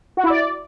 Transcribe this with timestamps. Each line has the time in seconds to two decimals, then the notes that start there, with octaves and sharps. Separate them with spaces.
0.17 F#4
0.24 E4
0.30 D5